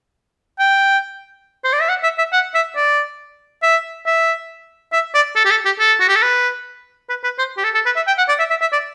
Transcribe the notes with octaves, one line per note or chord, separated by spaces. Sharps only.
G5
C5
D5
E5
F#5
E5
E5
F#5
E5
D5
E5
E5
E5
D5
A4
G4
A4
G4
A4
F#4
G4
A4
B4
B4
B4
C5
G4
A4
A4
B4
E5
G5
F#5
D5
E5
E5
E5
D5